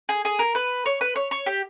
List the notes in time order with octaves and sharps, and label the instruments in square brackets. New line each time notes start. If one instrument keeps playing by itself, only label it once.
[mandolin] G#4
G#4
A#4
B4
C#5
B4
C#5
C#5
G4